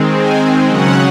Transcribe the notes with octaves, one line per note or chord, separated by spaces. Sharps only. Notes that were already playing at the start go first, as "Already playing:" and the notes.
Already playing: D#3 G#3 C4
G#5
C#3 F#3 C#4 F#5